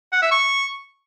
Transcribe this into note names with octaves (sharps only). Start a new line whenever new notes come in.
F#5
E5
C#6